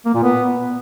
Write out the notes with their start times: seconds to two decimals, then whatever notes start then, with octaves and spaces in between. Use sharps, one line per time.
0.06 A#3
0.14 A#2
0.23 B3